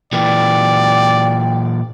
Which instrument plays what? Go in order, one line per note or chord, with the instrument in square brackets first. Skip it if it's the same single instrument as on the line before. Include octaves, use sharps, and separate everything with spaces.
[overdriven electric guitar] A#2 E3 [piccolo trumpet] D5 [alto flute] G5